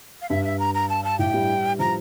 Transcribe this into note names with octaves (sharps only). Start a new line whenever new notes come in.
F5
G2 E5
E5
A#5
A#5
A5
A5
A2 G5
G3
F3 A#5